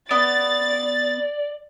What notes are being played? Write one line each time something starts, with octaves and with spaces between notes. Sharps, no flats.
B3 D5 A6